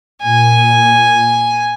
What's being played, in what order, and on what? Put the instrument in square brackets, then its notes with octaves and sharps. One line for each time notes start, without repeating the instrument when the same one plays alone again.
[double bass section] A#2 [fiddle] G#5